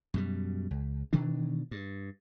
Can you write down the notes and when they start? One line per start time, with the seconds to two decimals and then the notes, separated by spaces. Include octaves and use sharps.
0.14 F#2 B2 G3
0.71 C#2
1.13 B2 D#3 E3 D4
1.71 G2